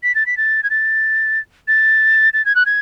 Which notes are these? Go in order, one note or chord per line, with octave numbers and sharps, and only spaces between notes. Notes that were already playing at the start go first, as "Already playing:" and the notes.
B6
A6
B6
A6
G#6
A6
A6
A6
G#6
F#6
G#6